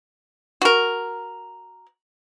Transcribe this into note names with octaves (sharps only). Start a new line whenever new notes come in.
F#4 A#4